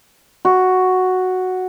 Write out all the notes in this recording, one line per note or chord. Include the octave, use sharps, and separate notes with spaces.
F#4